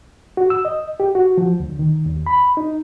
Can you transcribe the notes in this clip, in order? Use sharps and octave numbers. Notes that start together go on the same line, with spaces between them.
F#4
E6
D#5
G4
F#4
F3
D2
D#3
D#2
B5
D#4